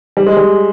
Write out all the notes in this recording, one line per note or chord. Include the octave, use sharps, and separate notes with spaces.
G3
G#3
G3